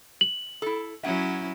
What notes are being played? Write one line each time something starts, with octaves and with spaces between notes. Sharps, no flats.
F#7
E4 A4
F#3 C#4 E4 E5 F#5